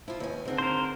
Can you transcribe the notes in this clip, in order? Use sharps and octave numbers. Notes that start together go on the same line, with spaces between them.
F3 E4 F4
D#2 B2 G#5
G#2 D3 C4 D4
A#4 C5